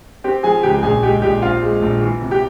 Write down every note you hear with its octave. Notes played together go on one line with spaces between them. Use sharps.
C4 G4 G5
F3 G#4 G#5
C#2 G4 G5
A#1 G#4 G#5
G#3 G4 G5
A#1 G4 G5
C4 F4 F5
G#3
A#1
E3
C3
G4 G5